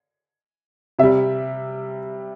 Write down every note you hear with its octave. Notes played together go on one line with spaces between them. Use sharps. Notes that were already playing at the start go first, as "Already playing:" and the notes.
C3 G3 E5